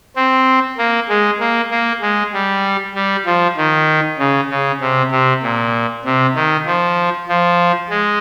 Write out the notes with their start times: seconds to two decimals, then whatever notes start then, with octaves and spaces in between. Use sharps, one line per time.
0.16 C4
0.78 A#3
1.09 G#3
1.40 A#3
1.71 A#3
2.01 G#3
2.33 G3
2.94 G3
3.26 F3
3.57 D#3
4.19 C#3
4.50 C#3
4.80 C3
5.11 C3
5.42 A#2
6.05 C3
6.35 D#3
6.66 F3
7.28 F3
7.90 G#3